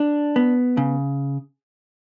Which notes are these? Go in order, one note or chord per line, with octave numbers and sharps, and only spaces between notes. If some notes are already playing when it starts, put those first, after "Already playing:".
Already playing: D4
B3
C#3